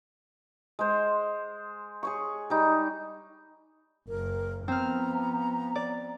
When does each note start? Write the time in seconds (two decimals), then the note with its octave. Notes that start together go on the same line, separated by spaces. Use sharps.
0.79 G#3 C5
2.03 G#4 C#5 C#6
2.50 G3 D#4
4.08 F#1 A#4
4.68 F3 B3 C4 A#5 F6
5.75 D5